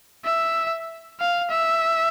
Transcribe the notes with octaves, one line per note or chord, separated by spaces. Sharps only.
E5
F5
E5